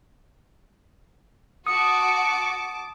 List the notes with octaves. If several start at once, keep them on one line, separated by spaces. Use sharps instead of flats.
F#4 A5 D6 D#6 C#7